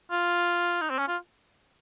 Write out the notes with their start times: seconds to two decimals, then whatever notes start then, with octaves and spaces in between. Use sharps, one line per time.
0.11 F4
0.81 D#4
0.90 C4
0.99 C#4
1.08 F4